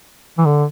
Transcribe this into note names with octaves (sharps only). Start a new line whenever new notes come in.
E3
D3